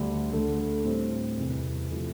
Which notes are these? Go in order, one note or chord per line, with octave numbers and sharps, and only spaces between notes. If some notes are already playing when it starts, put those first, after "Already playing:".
Already playing: D2 D3 G3 D4 A4
D2 D3 A3
A2 G3 C4
E2 C3 G3
C3 F3 A3 E4